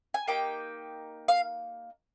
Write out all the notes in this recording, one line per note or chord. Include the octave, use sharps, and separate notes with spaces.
G#5
A#3 D#4 G4 G5
F5